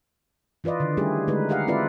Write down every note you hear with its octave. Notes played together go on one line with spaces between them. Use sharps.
E3 F4 B4 D5 D#5
D3 D#3
G3 A3 C#4 E4 G4 G#4
D3 G#3 A3 D#4 B4
G4 A#4 D#5 F5 F#5
G#3 C4 E4 F4 B4 D5